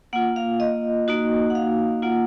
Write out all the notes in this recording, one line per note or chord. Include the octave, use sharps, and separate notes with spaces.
A#3 F4 F#5
F5
D#5
A#3 D#4 F#4
F#5
F5
A#3 F4 F#5